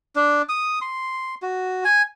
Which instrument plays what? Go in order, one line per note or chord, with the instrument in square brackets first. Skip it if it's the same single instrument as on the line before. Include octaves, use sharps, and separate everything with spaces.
[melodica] D4
D#6
C6
F#4
G#5